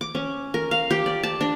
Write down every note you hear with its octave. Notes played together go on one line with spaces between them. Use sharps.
D6
C#4
A#4
F5
G4
D5
A5
D4